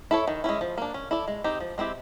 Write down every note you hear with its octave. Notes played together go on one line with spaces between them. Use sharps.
E4 A4 C#5
D#3
G#3 C#4 E4
F3
A#3 D4
C#4
E4 A4 D5
G#3
C4 D#4 G4
F3
G#3 C4 E4 G4